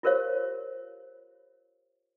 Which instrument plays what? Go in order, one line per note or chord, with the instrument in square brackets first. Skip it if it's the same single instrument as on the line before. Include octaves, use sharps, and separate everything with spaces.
[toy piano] F4 G4 A#4 C5 C#5 F5